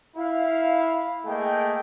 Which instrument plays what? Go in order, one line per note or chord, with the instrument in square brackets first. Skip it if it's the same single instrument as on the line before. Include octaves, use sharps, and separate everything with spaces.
[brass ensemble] E4 F5
A3 A#3 G#4 D#5 G5